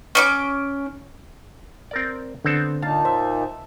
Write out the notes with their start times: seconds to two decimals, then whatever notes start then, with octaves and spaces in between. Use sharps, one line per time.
0.15 C#4 C#6 D6
1.91 C4 A#4 D5
2.44 D3 B3 C4 A4
2.82 A#2 A#3 D#4 F5 A5
3.05 C5 E5